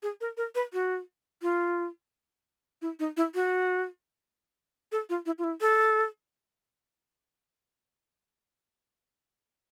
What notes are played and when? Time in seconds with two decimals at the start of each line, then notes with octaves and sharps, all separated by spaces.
0.03 G#4
0.21 A#4
0.37 A#4
0.55 B4
0.73 F#4
1.42 F4
2.82 E4
2.99 D#4
3.17 E4
3.35 F#4
4.92 A4
5.10 F4
5.26 E4
5.38 F4
5.44 E4
5.61 A4